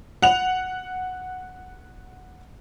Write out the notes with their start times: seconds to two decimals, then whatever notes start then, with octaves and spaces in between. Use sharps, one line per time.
0.22 F#5 F7